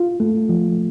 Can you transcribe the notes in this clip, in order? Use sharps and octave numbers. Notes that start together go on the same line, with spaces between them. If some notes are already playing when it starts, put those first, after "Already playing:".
Already playing: F4
A3
F3